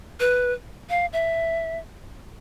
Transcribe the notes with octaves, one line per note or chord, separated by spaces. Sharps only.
B4
F5
E5